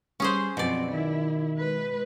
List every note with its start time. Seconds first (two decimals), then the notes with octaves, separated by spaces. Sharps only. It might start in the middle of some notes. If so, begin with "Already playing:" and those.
0.20 G3 C#4 G#4 C5
0.57 F#2 B2 F3 C4 D5
0.92 D#3 E4
1.58 G#3 B4